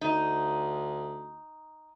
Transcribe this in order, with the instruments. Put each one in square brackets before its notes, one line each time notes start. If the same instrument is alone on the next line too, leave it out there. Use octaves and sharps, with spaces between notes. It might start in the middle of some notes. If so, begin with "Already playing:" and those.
[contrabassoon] D2 [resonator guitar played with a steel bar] D#4